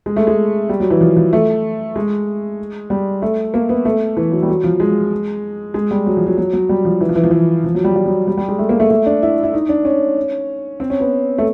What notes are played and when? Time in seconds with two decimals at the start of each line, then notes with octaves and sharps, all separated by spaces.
0.06 G#3
0.16 A3
0.27 G#3
0.69 G3
0.80 F#3
0.90 E3
1.01 F3
1.17 F3
1.33 A3
1.96 G#3
2.90 G3
3.22 A3
3.54 A#3
3.69 B3
3.85 A3
4.17 E3
4.32 F#3
4.43 G3
4.48 F#3
4.64 F3
4.80 G#3
5.74 G#3
5.91 G3
6.07 F#3
6.17 F3
6.27 F#3
6.38 F#3
6.53 F#3
6.69 G3
6.85 F3
7.01 E3
7.09 F3
7.16 E3
7.24 F3
7.31 E3
7.64 F3
7.75 F#3
7.84 G3
7.96 G3
8.06 F#3
8.27 G3
8.37 G3
8.48 G#3
8.59 A3
8.69 A#3
8.80 A3
8.91 A3
9.06 D4
9.22 E4
9.43 E4
9.53 D#4
9.69 D4
9.85 C#4
10.80 C4
10.90 C#4
11.00 B3
11.38 A3